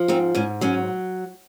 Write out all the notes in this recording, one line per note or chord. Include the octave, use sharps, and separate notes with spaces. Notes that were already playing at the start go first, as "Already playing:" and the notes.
Already playing: F3
G#2 C4 D#4
G#2 C#4
F#3 C#4